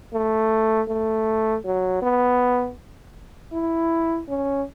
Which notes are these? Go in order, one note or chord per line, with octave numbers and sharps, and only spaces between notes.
A3
A3
F#3
B3
E4
C#4